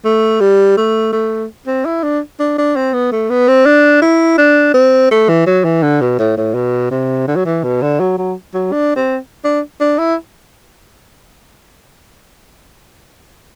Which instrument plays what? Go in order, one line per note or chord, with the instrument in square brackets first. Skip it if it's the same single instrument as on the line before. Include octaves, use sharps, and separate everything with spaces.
[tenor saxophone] A3
G3
A3
A3
C4
E4
D4
D4
D4
C4
B3
A3
B3
C4
D4
E4
D4
C4
A3
E3
F#3
E3
D3
B2
A2
A2
B2
C3
D3
F#3
E3
B2
D3
F#3
F#3
F#3
D4
C4
D4
D4
E4